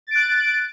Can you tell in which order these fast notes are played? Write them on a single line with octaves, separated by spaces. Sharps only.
A6 D7 F#6